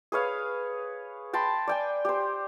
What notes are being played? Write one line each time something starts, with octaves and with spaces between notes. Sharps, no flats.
G#4 B4 C#5 F5
G5 A5 B5 C6
D5 G5 G#5
G4 C5